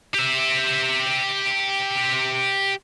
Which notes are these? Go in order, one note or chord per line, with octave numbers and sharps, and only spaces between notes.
G4 E5